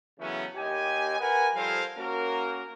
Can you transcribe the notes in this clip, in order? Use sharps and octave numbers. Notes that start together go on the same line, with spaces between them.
C#3 E3 F#3 A3 B3 C#4
D#2 G4 D#5 G#5
A#4 B4 F#5 G#5
F3 G3 A4 A#4 C5 F5
A#3 C#4 F#4 A#4